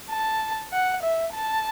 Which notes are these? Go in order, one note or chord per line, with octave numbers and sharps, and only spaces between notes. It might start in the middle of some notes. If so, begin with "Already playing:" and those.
A5
F#5
E5
A5